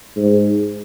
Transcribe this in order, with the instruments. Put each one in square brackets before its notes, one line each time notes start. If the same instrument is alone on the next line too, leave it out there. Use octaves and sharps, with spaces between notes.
[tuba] G#2